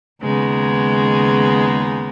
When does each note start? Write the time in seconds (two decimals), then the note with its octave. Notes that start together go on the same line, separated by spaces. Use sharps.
0.22 D#2 C#3 G#3 B3 D#4